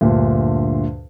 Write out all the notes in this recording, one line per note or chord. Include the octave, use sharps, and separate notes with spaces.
D2 G2 A#2